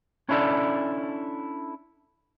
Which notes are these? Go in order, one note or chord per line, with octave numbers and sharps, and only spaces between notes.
C#4 D4 E4 A4 D5